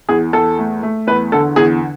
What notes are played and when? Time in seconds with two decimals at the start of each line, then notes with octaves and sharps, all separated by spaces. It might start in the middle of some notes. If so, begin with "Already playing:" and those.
0.09 E2 G#4
0.33 E2 A4
0.58 A3
0.83 A3
1.07 E2 B4
1.32 D3 A4
1.56 E2 G#4